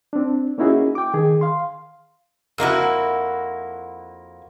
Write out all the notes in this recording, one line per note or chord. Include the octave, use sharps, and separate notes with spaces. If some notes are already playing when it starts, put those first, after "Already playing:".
C4 D4
A#3 C#4 D#4 E4 F#4 G#4
G5 D6
D#3 G#4
F5 C6
F2 A#3 E4 F#4